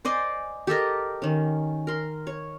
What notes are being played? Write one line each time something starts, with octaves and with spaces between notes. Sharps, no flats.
C5 D5 D#5 G#5
G4 A4 A#4 D#5
D#3 C#4
A#4 C6
C#5